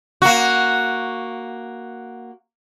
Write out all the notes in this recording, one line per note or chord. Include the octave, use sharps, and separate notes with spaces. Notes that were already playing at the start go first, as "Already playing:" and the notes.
A#3 F#4